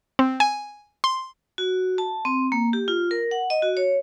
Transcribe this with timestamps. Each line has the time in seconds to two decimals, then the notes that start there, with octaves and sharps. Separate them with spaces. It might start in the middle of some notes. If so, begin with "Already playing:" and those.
0.19 C4
0.40 G#5
1.04 C6
1.58 F#4
1.98 A5
2.25 C4
2.52 A#3
2.73 G4
2.88 F4
3.11 A#4
3.31 F#5
3.50 D#5
3.62 F#4
3.77 C#5